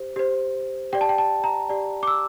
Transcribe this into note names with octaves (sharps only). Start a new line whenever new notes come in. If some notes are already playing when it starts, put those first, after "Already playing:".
Already playing: G4 C5
G4 C5
G4 D5 G5
A5
G5
A5
A#5
G4 D5
D6
E6